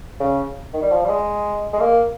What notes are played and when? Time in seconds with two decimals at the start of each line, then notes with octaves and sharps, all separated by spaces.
0.20 C#3
0.73 D#3
0.82 G3
0.91 F3
1.04 G3
1.09 G#3
1.73 G#3
1.80 A#3